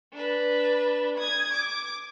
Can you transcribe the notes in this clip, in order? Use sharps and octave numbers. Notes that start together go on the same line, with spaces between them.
D4 B4
D#6 G#6
D6